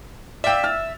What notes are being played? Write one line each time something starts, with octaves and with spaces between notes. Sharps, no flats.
D5 E5 F5 G5 E6
F6 A6